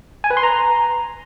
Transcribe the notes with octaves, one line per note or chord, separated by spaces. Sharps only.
G#5
B4
C6
A#5